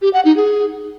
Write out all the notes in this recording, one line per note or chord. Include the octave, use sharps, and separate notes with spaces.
G4
F#5
D#4
G#4